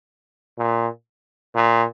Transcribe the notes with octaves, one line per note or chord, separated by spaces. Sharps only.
A#2
A#2